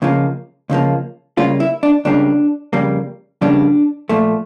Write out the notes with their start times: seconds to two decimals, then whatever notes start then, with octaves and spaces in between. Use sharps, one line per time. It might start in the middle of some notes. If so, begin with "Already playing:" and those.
0.02 C#2 C#3 F3 A#3
0.70 C#2 C#3 F3 A#3
1.37 C#2 C#3 G3 A#3 F4
1.60 E4
1.83 D4
2.05 C#2 C#3 G3 A#3 D4
2.73 F2 C#3 G3 A#3
3.41 F2 C#3 G3 A#3 D4
4.09 A#2 F3 A3